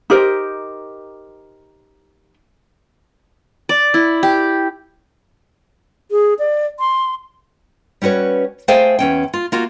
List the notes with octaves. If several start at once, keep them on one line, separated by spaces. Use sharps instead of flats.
D#4 G4 A#4 C5
D5
E4
G4
G#4
D5
C6
G3 C#4 F#4 B4 C#5
A3 G#4 C5 F5 G5 G#5
E2 C#4 G5
F4
A#3 F4 F#4